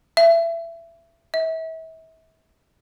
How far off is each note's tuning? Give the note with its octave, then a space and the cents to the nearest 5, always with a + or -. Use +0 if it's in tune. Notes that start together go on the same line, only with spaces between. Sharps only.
E5 +25
E5 -35